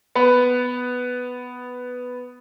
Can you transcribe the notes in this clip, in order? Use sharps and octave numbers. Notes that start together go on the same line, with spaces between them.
B3 B4